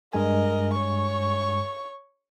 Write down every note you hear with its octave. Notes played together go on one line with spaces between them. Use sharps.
G2 G#3 A#4 D#5 G#5
C#5 C#6